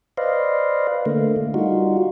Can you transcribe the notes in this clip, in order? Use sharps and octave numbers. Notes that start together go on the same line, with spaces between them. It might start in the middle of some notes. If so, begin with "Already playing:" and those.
B4 C5 D5 D#5 F5
D3 A3 A#3
G3 D#4 F4 F#4